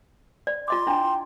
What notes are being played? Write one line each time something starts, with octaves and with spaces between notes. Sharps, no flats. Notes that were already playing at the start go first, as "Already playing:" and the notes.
D5
F4 D#5 C6 D6
D4 E4 G5